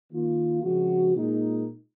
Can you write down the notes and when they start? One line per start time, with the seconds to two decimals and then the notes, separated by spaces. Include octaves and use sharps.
0.11 D#3 A#3 F4
0.62 C#3 F3 G#3 C4 F#4
1.14 A#2 G#3 D#4 A#4